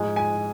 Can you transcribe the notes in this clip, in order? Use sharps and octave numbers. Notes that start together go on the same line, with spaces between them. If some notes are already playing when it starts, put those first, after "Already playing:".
Already playing: G#2 F3 G#3 G#5
G#5